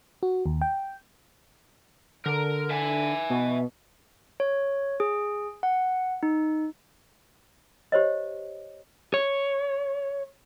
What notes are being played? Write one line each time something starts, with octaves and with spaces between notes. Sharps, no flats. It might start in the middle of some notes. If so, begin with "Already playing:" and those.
F#4
D#2
G5
D3 A#4
E5 G#5
B2
C#5
G#4
F#5
D#4
G4 C5 C#5 D#5
C#5